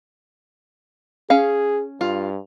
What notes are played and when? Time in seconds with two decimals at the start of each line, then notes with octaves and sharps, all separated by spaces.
1.30 C#4 G#4 F5
2.01 G2 F4